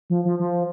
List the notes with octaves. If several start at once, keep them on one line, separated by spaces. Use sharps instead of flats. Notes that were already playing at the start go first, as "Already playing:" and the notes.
F3
F3
F3